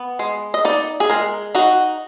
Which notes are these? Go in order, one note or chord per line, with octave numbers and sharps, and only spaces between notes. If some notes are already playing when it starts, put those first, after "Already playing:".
Already playing: B3
G#3
D#5
D#4 D5
G#4
G#3 A#4
D#4 F#4